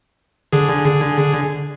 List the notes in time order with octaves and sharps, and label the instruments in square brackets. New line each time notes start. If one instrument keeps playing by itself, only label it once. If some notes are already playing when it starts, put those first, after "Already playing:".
[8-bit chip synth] D3 G#4